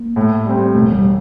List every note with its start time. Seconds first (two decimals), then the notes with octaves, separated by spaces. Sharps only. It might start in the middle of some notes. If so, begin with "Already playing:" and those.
Already playing: A#3
0.16 A2
0.45 G3 C4
0.74 E1 A3
0.93 G3